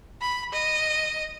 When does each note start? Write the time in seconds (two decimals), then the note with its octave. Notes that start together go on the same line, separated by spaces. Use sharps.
0.21 B5
0.52 D#5